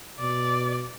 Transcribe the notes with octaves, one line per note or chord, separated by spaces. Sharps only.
B2 D5